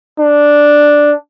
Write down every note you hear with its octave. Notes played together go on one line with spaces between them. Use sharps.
D4